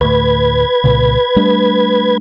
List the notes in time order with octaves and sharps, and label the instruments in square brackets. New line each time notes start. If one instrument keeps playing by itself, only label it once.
[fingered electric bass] D2 A2 [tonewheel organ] B4 G#6
[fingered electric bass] C2 A#2 C#3
G3 A3 D4